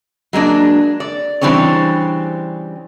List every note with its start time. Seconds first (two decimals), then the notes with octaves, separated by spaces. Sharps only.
0.33 F#3 G#3 A#3 D4
1.00 D5
1.41 C#3 E3 G3 C4 D4 C#5